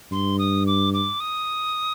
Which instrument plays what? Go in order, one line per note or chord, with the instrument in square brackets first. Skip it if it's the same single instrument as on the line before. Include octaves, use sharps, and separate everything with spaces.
[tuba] G2 [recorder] C6
[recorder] D#6
D6
D6
D#6